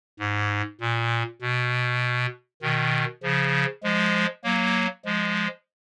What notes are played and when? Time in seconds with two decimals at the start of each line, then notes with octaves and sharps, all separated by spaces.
0.19 G#2
0.81 A#2
1.41 B2
2.62 B2 D#3
3.23 C#3 F3
3.83 F3 G#3
4.44 F#3 A#3
5.05 F3 G#3